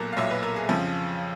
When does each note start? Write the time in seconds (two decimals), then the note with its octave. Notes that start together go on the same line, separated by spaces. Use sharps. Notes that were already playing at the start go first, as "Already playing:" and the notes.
Already playing: B1 A#2 F#3 A4 A#4
0.13 F5
0.17 B1 A#2 F#3 E5
0.30 B4
0.43 A#4
0.56 G#4
0.69 F2 C#3 F3